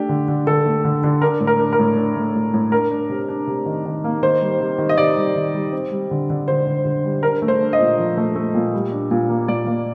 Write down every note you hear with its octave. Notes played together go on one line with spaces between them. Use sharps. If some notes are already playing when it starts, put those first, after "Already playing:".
Already playing: A3 D4 G4
D3
D3
D3 A4
A3
D3
D3
D4 A#4
A2
A#4
D4
A#4
A2
D4
A3
A2
A2
D4 A#4
D4
C3
D4
C3
D#3
D#3
A#3
D#3 C5
G3
C3
D#3
D#5
C3 D5
G3
D#3
G3
C4
G3
D3
D3
D3 C5
D3
D3
G3
D4 A#4
A3
C5
D4
D#5
A#2
F3
A3
A3
A#2
G3
D4
A#2
A#3
A#2 D5
A#3